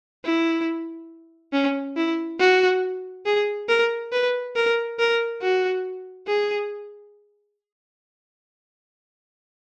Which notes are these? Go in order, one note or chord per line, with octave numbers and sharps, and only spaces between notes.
E4
C#4
E4
F#4
G#4
A#4
B4
A#4
A#4
F#4
G#4